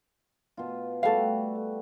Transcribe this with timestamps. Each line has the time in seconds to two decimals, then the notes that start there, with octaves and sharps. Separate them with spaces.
0.57 B2 F4
1.03 G3 A3 F#4 A4 F5